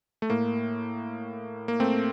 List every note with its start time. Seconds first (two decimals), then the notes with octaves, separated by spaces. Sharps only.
0.22 A3
0.30 A2 A#3
1.68 A#3
1.80 A3 C4